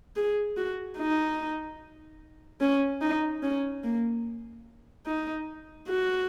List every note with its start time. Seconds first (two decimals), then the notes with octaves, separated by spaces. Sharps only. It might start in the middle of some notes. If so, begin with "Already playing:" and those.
0.16 G#4
0.57 F#4
0.98 D#4
2.61 C#4
3.02 D#4
3.43 C#4
3.83 A#3
5.06 D#4
5.88 F#4